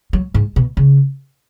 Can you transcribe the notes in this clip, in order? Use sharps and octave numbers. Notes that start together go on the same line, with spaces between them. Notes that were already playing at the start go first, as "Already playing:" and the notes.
F#3
G#2
B2
C#3